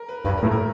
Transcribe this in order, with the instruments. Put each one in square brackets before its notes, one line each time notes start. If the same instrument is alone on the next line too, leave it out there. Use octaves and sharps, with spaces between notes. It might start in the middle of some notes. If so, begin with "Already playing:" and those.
Already playing: [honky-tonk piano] A#4
B4
[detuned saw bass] G2 [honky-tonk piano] B4
[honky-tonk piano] A#4
[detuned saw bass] A2
[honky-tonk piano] A#4